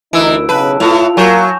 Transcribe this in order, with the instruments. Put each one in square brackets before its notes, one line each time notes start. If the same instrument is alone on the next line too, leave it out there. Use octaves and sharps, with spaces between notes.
[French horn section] D2 A#4 [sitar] E3 [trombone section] D#4 [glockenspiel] E6 D7
[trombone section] B1 [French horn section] C#3 [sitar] B4 [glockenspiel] A5
[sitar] A2 [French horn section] F4 [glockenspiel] F7
[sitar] F#3 [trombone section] A#3 F#4 A#4 [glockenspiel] G#5 C#6 G6